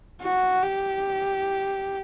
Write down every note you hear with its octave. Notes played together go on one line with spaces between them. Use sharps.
F#4
G4